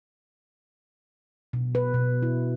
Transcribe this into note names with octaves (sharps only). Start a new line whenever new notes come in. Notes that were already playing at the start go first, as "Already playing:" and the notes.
B2
B4
B2
E4